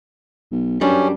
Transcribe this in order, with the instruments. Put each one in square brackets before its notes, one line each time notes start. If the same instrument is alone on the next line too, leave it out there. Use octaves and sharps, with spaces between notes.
[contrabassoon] B1
[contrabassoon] F#2 [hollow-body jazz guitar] G3 D4 [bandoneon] C#4